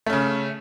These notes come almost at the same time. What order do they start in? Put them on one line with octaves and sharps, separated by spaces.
A3 C#4 C#3